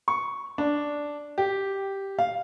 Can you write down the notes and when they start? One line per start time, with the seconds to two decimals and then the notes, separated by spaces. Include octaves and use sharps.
0.08 C#6
0.58 D4
1.38 G4
2.19 F5